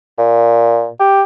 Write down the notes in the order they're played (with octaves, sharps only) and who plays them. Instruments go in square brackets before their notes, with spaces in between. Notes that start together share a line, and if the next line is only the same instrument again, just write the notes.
[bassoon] A#2
G4